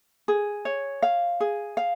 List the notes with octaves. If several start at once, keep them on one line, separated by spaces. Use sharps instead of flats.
G#4
C#5
F5
G#4
F5